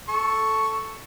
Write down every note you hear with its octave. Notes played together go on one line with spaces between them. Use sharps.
A4 C#6